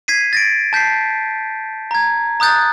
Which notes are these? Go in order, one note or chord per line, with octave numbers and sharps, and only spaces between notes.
G#6 B6 C7 D#7
A6 A#6 D7
A5 G6 B6 C7
A#5 G#6
A#5 D#6 F#6 G6 A6